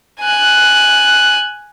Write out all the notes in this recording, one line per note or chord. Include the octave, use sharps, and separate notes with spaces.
G#5 F#6